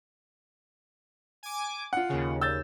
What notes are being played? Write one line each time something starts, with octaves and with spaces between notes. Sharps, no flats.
G#5 D6
F4 F#5
D#2 C#3
E6 G6 A6